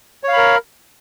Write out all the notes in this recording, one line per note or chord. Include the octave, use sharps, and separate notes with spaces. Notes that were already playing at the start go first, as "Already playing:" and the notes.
A#4 C#5 F5 B5